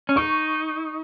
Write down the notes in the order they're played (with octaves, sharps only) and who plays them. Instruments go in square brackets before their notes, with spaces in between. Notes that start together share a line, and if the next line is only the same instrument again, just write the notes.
[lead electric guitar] C#4
[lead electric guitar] D#4 [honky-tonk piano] C#6